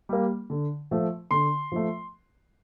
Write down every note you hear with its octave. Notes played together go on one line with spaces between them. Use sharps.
G3 A#3
D3
F3 A3
D3 C6
F3 A3